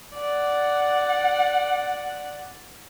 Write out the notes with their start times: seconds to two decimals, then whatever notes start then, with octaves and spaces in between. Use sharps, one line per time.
0.15 D5 F#5